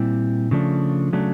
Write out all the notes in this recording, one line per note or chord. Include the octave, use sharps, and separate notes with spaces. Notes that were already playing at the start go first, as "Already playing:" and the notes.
Already playing: A#2 G3 C4 E4
C#3 F3 A3 D4
C#3 F#3 A3 D4